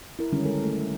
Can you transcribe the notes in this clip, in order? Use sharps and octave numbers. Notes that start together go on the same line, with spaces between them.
E4 A#4
D3 D#3 G3 G#3 C#4
G#3 A4 A#4
A3
G3